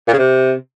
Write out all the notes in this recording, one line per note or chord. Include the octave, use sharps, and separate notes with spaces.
A#2
C#3
C3